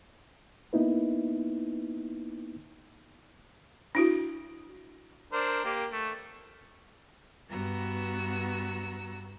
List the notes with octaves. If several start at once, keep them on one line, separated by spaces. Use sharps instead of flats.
A#3 B3 D#4 E4 B4
D4 E4 F#4
D4 A#4 C5
A#3 G4
A3
G2 B3 F#4 A#5 E6